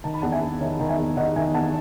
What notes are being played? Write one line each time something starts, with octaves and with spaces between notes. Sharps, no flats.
D#3 A5
B5
E2 F#5 A5
E5 G#5
E2
D#3 C#5 E5
D#3
E5 G#5
E2
D#3 D#5 F#5
D#3 E5 G#5
E2 F#5 A5